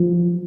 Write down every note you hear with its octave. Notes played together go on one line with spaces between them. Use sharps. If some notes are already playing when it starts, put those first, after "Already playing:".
Already playing: F3